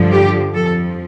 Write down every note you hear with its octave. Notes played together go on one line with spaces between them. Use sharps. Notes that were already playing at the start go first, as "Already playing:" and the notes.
Already playing: G2 D3 F3
G4
F2 F3 A4